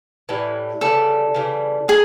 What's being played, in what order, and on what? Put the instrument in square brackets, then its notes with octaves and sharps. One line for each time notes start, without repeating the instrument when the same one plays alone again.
[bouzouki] A2 E3 G3
[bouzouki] C#3 E3 G3 [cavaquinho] A4
[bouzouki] C#3 E3 G3
[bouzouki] D#4 [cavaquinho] G#4